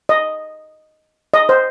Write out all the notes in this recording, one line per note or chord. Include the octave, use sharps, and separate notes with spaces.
D#5
D#5
C5